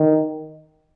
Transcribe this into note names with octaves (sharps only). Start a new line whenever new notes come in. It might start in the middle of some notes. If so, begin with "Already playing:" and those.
Already playing: D#3